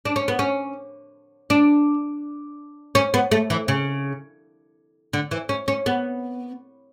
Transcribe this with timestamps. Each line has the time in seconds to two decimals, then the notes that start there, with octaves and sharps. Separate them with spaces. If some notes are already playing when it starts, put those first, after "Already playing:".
0.05 D4
0.16 C#4
0.28 B3
0.39 C#4
1.50 D4
2.95 C#4
3.14 B3
3.31 A3
3.50 E3
3.68 C#3
5.13 D3
5.31 E3
5.49 C#4
5.68 C#4
5.86 B3